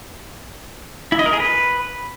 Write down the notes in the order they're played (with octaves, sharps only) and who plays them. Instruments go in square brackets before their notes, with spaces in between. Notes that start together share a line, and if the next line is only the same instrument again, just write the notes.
[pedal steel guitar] E4
D#5
A#4
G#4
B4